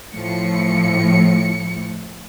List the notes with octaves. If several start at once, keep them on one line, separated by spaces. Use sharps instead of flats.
A2 F3 C#7